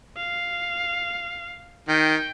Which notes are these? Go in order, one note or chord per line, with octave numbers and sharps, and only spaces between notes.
F5
D#3 G5